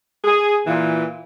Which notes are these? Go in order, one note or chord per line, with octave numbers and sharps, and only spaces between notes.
G#4
A#2 E3